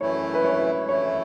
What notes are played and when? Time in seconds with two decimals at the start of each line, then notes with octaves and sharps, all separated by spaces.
0.01 F#2 E3 A3 E4 C#5
0.34 B4
0.44 C#5
0.88 F#2 E3 A3 E4 C#5